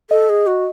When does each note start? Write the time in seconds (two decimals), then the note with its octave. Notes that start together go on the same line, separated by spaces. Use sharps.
0.10 A4 D#5
0.29 G#4
0.47 F#4